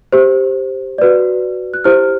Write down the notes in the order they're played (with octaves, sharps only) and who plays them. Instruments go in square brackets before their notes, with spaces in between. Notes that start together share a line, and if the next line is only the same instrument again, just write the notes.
[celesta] G4 C5
F#4 B4 D5
F#6
E4 G4 C5 F6